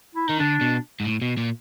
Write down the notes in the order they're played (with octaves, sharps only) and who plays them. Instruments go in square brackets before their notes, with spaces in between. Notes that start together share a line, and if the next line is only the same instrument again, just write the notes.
[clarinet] E4
[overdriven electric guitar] D#3 [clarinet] D#4
[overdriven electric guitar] D3 [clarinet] D4
[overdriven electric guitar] B2
G#2
A2
B2
A#2